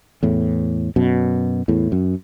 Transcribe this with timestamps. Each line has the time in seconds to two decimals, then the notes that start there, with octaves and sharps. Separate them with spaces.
0.23 E2 A2
0.96 F#2 B2
1.68 E2 A2
1.92 F#2